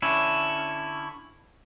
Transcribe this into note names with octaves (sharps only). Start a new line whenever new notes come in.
D3 C#4 E4